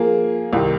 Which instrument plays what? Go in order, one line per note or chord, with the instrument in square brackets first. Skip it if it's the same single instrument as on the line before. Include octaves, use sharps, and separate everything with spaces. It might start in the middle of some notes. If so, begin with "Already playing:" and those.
Already playing: [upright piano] F3 A#3 G#4
C2 C3 D#3